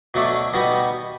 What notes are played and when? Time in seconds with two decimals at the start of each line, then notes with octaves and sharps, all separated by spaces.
0.14 B2 F#3 A3 D4
0.53 B2 G3 B3 D#4